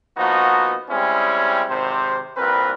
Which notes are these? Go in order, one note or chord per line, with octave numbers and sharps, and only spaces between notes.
F3 A#3 B3 D#4 F#4
G3 G#3 C4 C#4 E4 G#4
G#1 C3 C5
C2 A#2 C4 A#4 B4